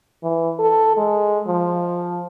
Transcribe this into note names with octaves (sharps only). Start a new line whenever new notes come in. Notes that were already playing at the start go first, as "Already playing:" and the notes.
E3
A4
G#3
F3